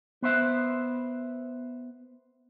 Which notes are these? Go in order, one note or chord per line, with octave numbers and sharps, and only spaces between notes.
B3 C5 E5